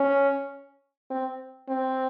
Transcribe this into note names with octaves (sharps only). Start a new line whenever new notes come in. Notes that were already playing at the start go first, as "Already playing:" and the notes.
Already playing: C#4
C4
C4